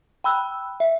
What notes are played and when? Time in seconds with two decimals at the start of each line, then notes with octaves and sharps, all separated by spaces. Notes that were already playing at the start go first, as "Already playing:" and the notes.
0.24 G5 B5 E6 F#6
0.80 E5